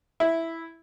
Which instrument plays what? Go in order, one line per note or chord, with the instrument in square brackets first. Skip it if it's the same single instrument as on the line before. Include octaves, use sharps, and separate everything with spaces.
[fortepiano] E4